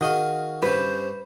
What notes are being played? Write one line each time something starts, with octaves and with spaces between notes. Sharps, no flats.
D#3 F#4 G#4 D#5 F5
G2 C#4 B4 C5